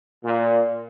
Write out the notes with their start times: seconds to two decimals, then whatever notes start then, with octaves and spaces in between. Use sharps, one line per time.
0.25 A#2